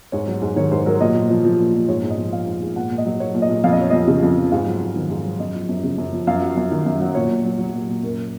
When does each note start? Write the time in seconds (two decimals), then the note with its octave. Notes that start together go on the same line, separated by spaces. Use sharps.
0.12 G#2 C#5
0.27 F#3
0.42 G#2
0.56 D#3 C#5
0.71 G#2 C5
0.86 F#3 A#4
1.00 A#2 D#5
1.15 A#2
1.30 F3
1.44 F3
1.59 A#2
1.74 A#2
1.88 G#2 C#5
2.03 G#2
2.10 D#5
2.17 F3
2.32 F3 F5
2.47 G#2
2.61 G#2
2.76 A#2 F#5
2.91 A#2
2.98 D#5
3.05 F#3
3.20 F#3 C#5
3.34 A#2
3.42 D#5
3.49 A#2
3.64 F2 F5
3.72 D#5
3.79 F3 C#5
3.90 F2 D#5
4.07 C#3
4.23 F2
4.37 F3
4.52 G#2 F5
4.66 F#3
4.81 G#2
4.96 D#3
5.10 G#2
5.25 F#3
5.40 F#2 D#5
5.54 F3
5.69 F#2
5.83 C#3
5.98 F#2
6.13 F3
6.27 F#2 F5
6.42 F#3
6.57 F#2
6.72 D#3
6.86 F#2
7.01 F#3
7.15 A#2 C#5
7.30 A#2
7.44 F#3
7.59 F#3
7.74 A#2
7.88 A#2
8.03 F#2 A#4